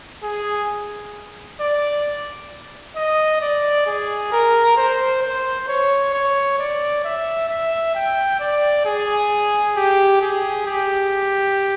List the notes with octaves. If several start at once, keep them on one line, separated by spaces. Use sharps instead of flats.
G#4
D5
D#5
D5
G#4
A#4
C5
C5
C#5
C#5
D5
E5
E5
G5
D5
G#4
G4
G#4
G4